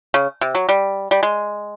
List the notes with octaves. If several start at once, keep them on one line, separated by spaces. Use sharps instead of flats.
C#3
C3
F#3
G3
G3
G#3